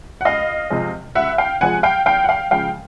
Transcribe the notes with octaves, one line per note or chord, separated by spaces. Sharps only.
F#5
C#2 D#5 F5
C3 F3 G#3
C#2 E5 F#5
F5 G5
C3 F3 G#3 F#5 G#5
F5 G5
E2 F5 G5
F#5
F5 G5
C#3 F3 G#3 F5 G5